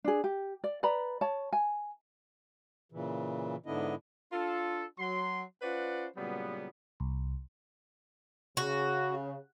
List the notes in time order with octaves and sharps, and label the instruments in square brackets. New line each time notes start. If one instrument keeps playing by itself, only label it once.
[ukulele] D4 G#4
G4
D5
B4 D5 A#5 B5
C#5 A5
G#5
[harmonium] A#2 C#3 E3
G#2 D3 B3 D4 E4 D#5
[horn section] D4 F4 A4
F#3 C6
C#4 F4 B4 C5 D5 F#5
A#2 C#3 F#3 G3 B3
[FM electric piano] C2
[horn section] C#3 [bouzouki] F#4